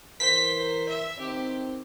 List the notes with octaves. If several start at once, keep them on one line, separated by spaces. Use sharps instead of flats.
E3 A#4 C5 B6
E5
D#3 C4 G4